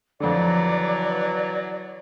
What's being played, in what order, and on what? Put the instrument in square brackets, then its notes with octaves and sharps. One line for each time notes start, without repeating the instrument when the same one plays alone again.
[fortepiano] F2 D3 [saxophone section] E3 F#3 [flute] D5